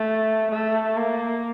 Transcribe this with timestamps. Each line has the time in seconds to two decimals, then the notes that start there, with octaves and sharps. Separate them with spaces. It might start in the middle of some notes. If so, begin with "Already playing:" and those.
Already playing: A3
0.52 A3
0.97 A#3